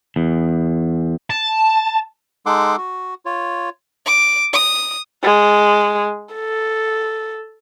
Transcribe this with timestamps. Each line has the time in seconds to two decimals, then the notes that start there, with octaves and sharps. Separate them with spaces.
0.16 E2
1.30 A5
2.46 G#3 D#4 A4 F#5 C6 D6
2.78 F#4
3.26 F4 C#5
4.06 D6
4.53 D#6
5.24 G#3
6.34 A4